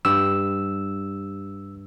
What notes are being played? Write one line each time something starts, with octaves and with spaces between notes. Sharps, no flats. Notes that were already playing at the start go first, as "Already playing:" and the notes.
G2 G4 E6